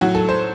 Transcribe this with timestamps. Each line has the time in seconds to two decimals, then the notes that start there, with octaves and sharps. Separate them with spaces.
0.01 A2 F#3 F#4
0.15 A4
0.29 C5